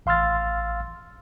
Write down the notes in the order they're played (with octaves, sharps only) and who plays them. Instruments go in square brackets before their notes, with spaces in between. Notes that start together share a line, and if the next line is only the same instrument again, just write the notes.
[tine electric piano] A1 F5 C6 E6 F6 A6